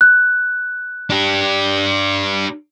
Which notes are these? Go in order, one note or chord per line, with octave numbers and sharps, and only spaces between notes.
F#6
D4 G4